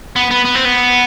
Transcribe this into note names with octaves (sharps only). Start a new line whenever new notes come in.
B3
B3
B3
C4
B3